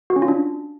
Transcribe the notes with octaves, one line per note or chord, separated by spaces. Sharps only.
F#4
C#4
F4
D4